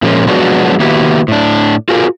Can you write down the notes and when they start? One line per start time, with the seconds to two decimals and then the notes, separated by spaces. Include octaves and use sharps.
0.02 A#2 F3 G#3 A#3 C#4 F4
0.27 F3 F#3 G#3 B3 D4 F#4
0.80 D#3 A#3 B3 E4 F#4 G4
1.28 A2 D4
1.89 F4 F#4 G#4 A#4